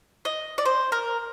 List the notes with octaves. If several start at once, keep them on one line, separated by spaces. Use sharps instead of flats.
D#5
D5
C5
A#4